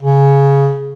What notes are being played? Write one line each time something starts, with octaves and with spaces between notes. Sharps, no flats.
C#3